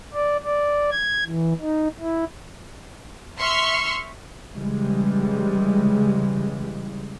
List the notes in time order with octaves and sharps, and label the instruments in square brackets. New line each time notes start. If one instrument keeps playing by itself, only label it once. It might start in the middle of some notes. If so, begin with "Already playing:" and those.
[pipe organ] D5
D5
G#6
E3
D#4
E4
[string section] E5 C6 C#6 F6
[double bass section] C#3 E3 G3 G#3